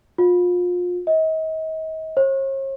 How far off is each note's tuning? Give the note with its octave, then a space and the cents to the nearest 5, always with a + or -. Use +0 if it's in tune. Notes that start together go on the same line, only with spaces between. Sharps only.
F4 +30
D#5 +40
C#5 -45